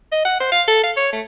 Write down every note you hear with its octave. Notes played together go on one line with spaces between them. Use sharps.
D#5
F#5
C5
F5
A4
F5
C#5
A3